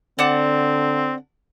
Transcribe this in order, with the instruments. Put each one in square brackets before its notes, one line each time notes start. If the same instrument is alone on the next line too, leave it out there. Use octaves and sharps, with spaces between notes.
[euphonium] D3 [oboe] C4 [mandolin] D5 F#5 A5